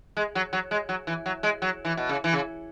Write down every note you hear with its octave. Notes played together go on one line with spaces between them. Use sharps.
G#3
F#3
F#3
G#3
F#3
E3
F#3
G#3
F#3
E3
B2
C#3
E3
C#3